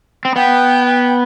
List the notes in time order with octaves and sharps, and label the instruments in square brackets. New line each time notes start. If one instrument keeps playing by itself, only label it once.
[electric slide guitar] C4
[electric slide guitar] B3 [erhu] G5